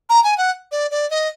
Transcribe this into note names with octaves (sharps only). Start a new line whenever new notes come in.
A#5
G#5
F#5
D5
D5
D#5